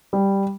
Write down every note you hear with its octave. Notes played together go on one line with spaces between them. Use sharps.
G3